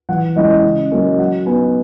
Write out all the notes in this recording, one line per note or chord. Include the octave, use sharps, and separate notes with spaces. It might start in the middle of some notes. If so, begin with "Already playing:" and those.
E3 F#5
G#3 C#4 E4 D#5
C#3
F#3 A#3 C#4
F#3 F#5
B3 D#4 G#5